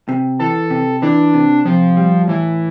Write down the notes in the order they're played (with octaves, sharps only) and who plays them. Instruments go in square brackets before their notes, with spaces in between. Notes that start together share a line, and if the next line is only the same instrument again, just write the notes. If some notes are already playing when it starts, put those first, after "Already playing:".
[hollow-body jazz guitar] C3
[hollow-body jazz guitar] E3 [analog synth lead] A4
[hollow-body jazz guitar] C3
[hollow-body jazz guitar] E3 [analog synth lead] D4
[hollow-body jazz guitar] C3
[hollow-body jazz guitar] C3 [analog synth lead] F3
[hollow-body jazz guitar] G3
[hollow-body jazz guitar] A2 [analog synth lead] E3